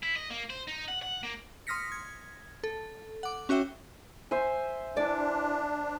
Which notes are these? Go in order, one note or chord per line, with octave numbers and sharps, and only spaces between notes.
E4
D#5
A#3
C5
D#4
F#5
F#5
A#3
C6 D#6 F6 A#6 B6 C#7
G#6
A4
F#5 D6
C#4 F#4 C#5 E5 G5
C5 E5 G#5
D4 E4 B4 D5